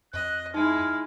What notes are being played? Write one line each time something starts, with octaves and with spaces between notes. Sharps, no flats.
F2 D#5 F#6
G#3 D#4 E4 F6